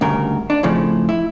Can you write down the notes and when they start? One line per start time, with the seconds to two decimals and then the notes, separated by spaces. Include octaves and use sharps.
0.01 D2 G2 C#3 A#4
0.50 D4
0.63 F2 A2 C#3 F3
1.09 E4